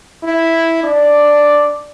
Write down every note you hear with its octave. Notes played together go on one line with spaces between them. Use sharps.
E4
D4 D5